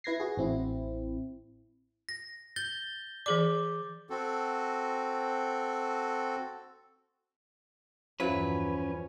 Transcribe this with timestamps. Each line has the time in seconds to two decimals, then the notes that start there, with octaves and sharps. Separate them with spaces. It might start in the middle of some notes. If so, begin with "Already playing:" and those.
0.04 E4 B4 G#6 A#6 C7
0.20 F#4 G#4
0.37 A1 C4 E4
2.09 A#6
2.56 G6 A6 G7
3.26 E3 G#4 D5 D6
4.10 C4 F#4 A4
8.20 E2 G2 F3 F#3 C#4 E4 B4